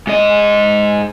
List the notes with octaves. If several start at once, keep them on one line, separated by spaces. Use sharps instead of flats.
G#2 D#5